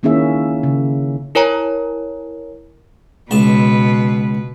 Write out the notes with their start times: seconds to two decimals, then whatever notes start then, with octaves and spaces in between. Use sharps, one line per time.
0.03 D#3 A#3 C#4 E4 G#4 E5
0.63 C#3
1.35 E4 A#4 C#5 G#5 A#5
3.31 C#2 B2 B4 A5